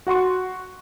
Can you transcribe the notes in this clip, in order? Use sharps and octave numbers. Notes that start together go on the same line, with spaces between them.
F#4 F#5 C6 C#6